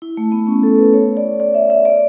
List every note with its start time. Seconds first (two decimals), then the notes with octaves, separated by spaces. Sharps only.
0.02 E4
0.17 A3
0.32 B3
0.47 C#4
0.63 A4
0.79 B4
0.94 C#5
1.17 D5
1.40 D5
1.54 E5
1.70 E5
1.85 D5